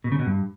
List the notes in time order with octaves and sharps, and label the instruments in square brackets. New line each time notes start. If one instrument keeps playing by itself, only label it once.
[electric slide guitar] B2
C#3
B2
G2